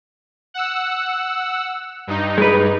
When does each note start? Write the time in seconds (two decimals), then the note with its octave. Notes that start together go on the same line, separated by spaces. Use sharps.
0.54 F#5 E6
2.07 G2 D#4
2.38 G#3 B4